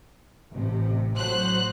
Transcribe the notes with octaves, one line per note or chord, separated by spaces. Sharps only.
A1 C3
A2 F#3 C5 F#6